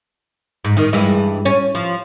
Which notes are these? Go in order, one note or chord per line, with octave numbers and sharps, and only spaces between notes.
G#2
D#3
G2 E3 G#3
C#4
F3